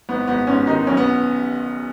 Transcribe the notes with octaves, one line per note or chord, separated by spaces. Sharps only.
G#1 B3
G#1 B3
G#2 C#4
D#3 D#4
B1 C#4
B3